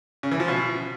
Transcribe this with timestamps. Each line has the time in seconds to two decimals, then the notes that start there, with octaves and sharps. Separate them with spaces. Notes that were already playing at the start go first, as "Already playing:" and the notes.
0.23 C#3
0.32 E3
0.40 F3
0.48 B2